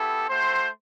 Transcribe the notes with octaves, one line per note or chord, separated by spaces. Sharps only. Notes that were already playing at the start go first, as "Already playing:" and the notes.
Already playing: B3 E4 G4 A4
A3 C4 F#4 C5